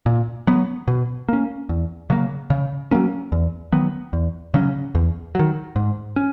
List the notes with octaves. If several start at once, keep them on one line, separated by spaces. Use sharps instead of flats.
A#2
F#3 B3
B2
A#3 C#4
E2
C#3 F#3 A#3
C#3
F#3 A#3 C#4
E2
D#3 F#3 B3
E2
C#3 F#3 C#4
E2
D#3 F#3
G#2
C#4